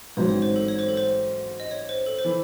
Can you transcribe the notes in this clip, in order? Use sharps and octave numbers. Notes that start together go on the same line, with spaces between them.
A1 G#2 F#3 C4 C#5
C#5
C5
A4
C#5
C5
A4
C5
D#5
C#5
C5
A4
C5
E3 A4